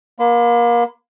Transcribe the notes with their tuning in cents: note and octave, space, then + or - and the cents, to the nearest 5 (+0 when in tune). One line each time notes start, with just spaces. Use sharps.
A#3 +30 B5 +45